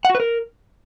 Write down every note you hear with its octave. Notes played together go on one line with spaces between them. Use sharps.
F#5
F#4
B4
A#4